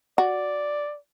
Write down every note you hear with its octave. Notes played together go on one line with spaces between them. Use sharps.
F#4 D5